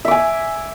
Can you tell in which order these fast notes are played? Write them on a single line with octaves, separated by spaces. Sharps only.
E5 D6 G#5